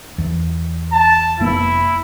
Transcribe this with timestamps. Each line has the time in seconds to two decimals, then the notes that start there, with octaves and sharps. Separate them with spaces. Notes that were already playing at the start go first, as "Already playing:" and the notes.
0.18 E2
0.93 A5
1.40 F1 A#3 B3 E4